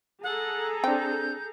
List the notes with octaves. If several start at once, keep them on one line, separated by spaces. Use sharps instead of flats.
G#4 A4 F#5 A#5
C4 D4 G5 G6